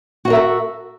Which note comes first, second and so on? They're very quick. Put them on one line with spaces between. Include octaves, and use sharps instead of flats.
F#4 D#5 A#4 E5 A4